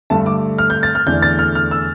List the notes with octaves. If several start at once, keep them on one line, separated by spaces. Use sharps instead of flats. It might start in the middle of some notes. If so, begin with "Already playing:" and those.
G2 D3 A3 A5
D6
F6
G6
A6
F6
E2 D3 A3 D4 G6
A6
F6
F6
E6